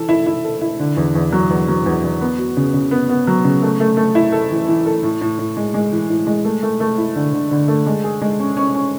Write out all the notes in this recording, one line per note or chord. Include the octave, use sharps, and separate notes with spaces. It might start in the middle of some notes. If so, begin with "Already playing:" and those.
Already playing: E3 A4
E4
E4
A4
E4
D3
E2
E2
F#3
E2
F#3
E2
E2
B3
F#4
C#3
C#3
B3
B3
F#3
C#3
A3
A3
A3
E4
A4
E3
E3
A4
A2
A2
A2
G#3
G#3
E3
A2
G#3
A3
A3
A3
E4
D3
D3
D3
A3
G#3
G#4
G#3
C#4
C#4
C#4